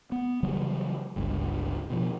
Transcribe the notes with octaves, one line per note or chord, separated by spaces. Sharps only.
B3
C#3 E3 F#3 G3
G1 C#2 G2
B2 F3